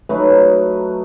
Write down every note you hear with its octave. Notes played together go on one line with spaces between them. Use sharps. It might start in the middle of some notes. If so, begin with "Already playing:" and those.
F#3 A3 D#4 B4